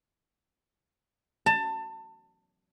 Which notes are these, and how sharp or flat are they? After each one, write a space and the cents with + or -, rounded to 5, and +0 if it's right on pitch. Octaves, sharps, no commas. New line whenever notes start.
A5 +25